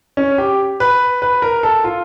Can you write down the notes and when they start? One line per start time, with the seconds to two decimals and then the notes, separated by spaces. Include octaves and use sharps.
0.17 C#4
0.38 G4
0.80 B4
1.22 B4
1.42 A#4
1.63 A4
1.84 F4